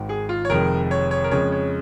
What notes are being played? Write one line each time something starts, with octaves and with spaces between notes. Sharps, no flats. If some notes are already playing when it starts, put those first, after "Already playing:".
Already playing: G#1 G#2 D#3
G#4
F4
C#5
F1 F2 D#3 G#3 A#4
C#5
C#5
A#4
F2 C#3 G#3 C#5
C#5